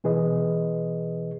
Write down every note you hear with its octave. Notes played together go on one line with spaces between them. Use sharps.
B2 E3 G#4 B4 D#5